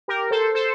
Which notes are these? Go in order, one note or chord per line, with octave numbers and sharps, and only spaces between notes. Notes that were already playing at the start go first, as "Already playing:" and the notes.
G4 A#4
A4 C5
A4 C5